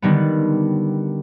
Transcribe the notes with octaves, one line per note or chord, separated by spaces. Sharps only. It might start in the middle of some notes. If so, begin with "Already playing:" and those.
D3 D#3 G3 B3